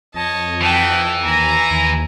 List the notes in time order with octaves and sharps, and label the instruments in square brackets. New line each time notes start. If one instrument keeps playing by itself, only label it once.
[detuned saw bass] F2 [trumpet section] C#5 D#5 [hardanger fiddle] A5
[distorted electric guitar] E3 [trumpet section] D#4 F#4 F#5 [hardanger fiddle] G5 A5
[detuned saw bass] D#2 [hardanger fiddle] G#5 [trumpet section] A#5
[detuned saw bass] D#2